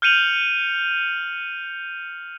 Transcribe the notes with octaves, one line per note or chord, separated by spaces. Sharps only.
F6 G6 C#7 D#7 F7 F#7